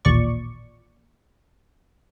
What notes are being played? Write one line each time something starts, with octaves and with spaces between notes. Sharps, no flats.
A1 D#2 A#2 D5 C#6